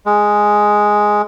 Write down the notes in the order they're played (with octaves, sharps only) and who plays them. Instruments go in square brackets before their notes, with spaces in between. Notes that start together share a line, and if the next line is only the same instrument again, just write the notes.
[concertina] G#3